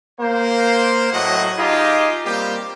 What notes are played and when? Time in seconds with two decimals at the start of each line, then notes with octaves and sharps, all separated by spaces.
0.20 A#3 C5
1.13 A2 F#3 F#4 D#5 F#5
1.57 D#4 F4 G4 G#4 D#5
2.25 G3 A#3 C4 G4